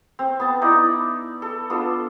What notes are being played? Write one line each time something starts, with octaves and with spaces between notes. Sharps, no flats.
C4
B3 A5
D#4 E4 D5
A4
B3 D4 F4 A4